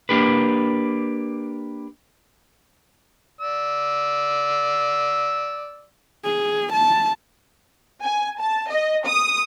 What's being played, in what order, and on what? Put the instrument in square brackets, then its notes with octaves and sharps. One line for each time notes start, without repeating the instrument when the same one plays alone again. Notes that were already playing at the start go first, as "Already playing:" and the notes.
[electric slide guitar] A#3 D4 G4 B4
[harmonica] D5 E6
[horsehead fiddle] G#4
A5
[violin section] G#5
A5
D#5
D#6